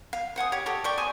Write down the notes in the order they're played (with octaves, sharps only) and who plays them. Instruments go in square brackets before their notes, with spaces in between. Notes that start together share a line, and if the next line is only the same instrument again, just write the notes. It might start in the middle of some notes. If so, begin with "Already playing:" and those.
[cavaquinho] F5
C5 F#5 G#5 D#6
G4 C#5
G4 A4 C#5
D5 G5 C#6
C5 G#5 C#6 D#6